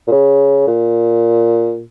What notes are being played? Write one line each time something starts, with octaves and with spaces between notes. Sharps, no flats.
A#2
C#3
A#2